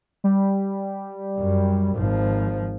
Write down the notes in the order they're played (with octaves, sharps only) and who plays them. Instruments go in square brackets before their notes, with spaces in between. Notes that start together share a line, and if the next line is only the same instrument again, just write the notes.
[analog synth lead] G3
[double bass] F#2
G#1 F3